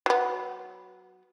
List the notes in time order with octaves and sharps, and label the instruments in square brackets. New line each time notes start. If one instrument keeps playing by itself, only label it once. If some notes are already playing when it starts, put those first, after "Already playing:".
[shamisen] F#3 B3